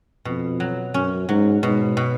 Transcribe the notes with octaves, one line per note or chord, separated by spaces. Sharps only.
F2 B2
F#3
F#2 C#4
G#2 F#3
G#2 B2
B2